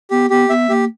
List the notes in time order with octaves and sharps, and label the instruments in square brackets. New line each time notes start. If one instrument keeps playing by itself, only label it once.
[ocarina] B3 [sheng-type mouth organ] G4
[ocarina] B3 [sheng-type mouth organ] G4
[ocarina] B3 [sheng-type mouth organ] E5
[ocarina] A#3 [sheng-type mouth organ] G4